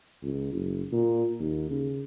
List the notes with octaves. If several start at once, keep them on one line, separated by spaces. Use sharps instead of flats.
C#2
F#1
A#2
D#2
C#3